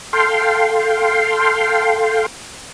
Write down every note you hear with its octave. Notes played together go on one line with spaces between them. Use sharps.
A4 F5 G5 C6